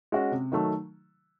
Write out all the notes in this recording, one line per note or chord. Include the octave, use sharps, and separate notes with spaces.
G#3 C#4 F#4
C3
D#3 F#3 A3